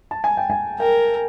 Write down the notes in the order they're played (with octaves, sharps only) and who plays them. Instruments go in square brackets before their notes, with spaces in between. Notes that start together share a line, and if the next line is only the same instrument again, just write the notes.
[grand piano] A5
G#5
G5
G#5
[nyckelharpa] A#4 [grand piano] G5